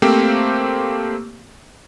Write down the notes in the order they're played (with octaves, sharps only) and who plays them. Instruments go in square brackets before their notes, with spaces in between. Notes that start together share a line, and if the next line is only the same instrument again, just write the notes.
[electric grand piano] A3 A#3 C4 G4 C5